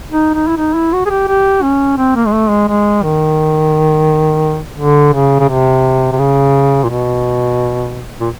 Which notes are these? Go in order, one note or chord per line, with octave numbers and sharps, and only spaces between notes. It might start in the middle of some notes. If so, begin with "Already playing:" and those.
D#4
D#4
E4
D#4
E4
F#4
G#4
G4
G4
C#4
C4
A#3
G#3
A3
G#3
G#3
D#3
D3
C#3
C#3
C3
C3
C#3
A#2
B2
A#2